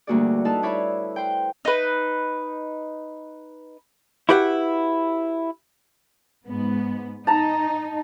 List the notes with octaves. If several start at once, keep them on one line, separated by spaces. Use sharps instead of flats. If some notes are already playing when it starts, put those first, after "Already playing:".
D2 G3 A#3 F#4 G#4 D5
D#4 E4 A4 B4 F5 A5
E4 C#5 D5 E5 F5 B5
B4 C5 G5
D#4 B4
E4 F#4 G4 B4 D5 F#5
G#2 B3
D#4 A5 A#5